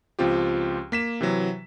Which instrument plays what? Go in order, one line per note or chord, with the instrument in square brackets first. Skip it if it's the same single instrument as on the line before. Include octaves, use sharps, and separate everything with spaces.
[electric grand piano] C#2 F3 C4 F4 G4
A#3 B6 E7
C3 E3 F#3